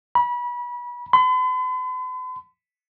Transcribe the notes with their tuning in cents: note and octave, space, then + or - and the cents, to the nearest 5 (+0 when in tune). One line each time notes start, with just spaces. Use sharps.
B5 -30
B5 +45